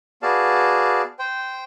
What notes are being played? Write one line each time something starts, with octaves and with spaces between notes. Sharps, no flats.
B3 F#4 G#4 D5 F5 A5
C5 G5